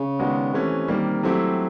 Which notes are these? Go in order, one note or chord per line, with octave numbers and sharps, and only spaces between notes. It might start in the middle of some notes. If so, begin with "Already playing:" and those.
Already playing: C#3
D#3 G#3 B3 D4 F#4
C3 E3 A3 C#4
D#3 G3 A#3
C3 F#3 A3 C4 E4 G4